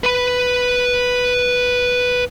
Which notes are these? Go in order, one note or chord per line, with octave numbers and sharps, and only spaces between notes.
B4 B5